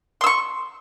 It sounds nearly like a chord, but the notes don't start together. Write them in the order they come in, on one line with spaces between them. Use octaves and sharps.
C6 E6 C#6